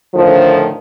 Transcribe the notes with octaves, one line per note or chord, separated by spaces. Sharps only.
A2 D3 D#3 F3